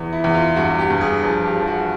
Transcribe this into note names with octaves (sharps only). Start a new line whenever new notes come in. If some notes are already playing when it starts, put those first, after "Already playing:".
Already playing: E2 E3
E4
E2
F4
G2 F#4
G4
G2
G#4
F3 G#4
G4
F3
F#4